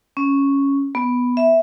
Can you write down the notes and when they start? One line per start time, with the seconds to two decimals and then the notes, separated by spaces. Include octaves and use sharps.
0.17 C#4
0.95 B3
1.37 E5